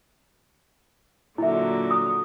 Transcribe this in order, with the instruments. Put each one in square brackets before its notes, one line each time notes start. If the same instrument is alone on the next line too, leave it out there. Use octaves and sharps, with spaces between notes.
[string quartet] A#2 D3 F#3 [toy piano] E4 E5
[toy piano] D#6